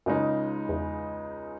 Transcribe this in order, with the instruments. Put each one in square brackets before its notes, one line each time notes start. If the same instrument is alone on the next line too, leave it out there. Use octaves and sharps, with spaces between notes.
[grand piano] C#2 C#3 G#3 D#4 [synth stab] F#2
[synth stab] E2